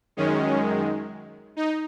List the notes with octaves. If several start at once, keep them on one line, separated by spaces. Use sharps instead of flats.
F#2 D#3 G#3 C#4
D#4